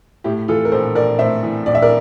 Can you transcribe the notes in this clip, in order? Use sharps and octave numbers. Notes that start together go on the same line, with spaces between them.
A2 E4 G4
E3 F4 A4
A#4
A#1 A4 C5
A#1 A#4 D5
A2 C5 E5
E3
A#1 D5
E5
A#4 D5